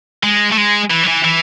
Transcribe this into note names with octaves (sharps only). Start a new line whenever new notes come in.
G#3
A3
G#3
E3
F#3
E3
E3